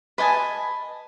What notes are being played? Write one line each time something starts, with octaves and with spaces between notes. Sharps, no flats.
B4 D#5 G#5 A5